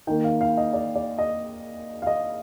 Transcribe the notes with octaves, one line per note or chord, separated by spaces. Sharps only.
D#3 A#3 G5
F5
F5
D#5
D5
D5
D#5
F5
D#5